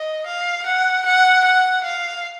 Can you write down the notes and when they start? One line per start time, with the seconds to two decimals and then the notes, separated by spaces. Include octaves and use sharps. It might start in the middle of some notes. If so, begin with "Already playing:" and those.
Already playing: D#5
0.26 F5
0.66 F#5
1.06 F#5
1.44 F#5
1.84 F5